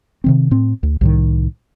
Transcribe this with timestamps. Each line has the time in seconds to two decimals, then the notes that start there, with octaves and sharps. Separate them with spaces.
0.24 C3 D#3 C4
0.51 A2 C4
0.83 D2
1.01 C2 A2 D#3